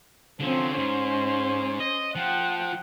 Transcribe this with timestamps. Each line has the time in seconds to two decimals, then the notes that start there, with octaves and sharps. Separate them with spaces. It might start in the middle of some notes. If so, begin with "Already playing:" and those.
0.40 D3 F3 C4 C#4
0.78 G#2 C#4 C5
1.80 D#5
2.16 F3 F#5 G5